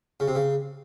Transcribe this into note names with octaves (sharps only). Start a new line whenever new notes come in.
C#3
C3
C#3